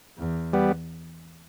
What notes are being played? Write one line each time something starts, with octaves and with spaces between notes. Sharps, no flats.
E2
G3 B3